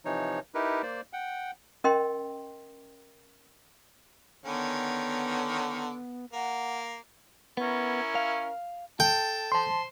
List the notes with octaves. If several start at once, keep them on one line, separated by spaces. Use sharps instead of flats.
C3 E3 F3 D#4 C#5
D#4 E4 G4 A#4 B4
A#3 C5 D5
F#5 G5
C#4 A#4 D#5 G5 C6
D3 D#3 B3 C#4
A#3 F#5
B3 C#4 E4 A#4
F5
A4 G5 A5
C5 A5 C6